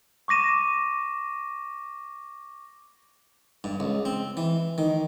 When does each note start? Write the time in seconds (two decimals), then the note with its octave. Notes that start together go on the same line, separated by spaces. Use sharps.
0.28 C#6 D6 A#6 D#7 E7
3.64 G2
3.80 C#2
4.05 C4
4.37 E3
4.78 D#3